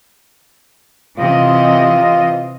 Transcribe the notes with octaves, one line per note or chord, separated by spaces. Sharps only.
C3 E3 F4 D#5